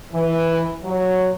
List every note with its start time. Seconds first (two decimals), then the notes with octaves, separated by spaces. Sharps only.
0.14 E3
0.83 F#3